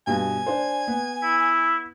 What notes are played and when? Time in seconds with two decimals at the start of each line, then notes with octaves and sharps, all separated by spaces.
0.07 G2 B2 G#5
0.46 D4 C5
0.88 B3
1.23 E4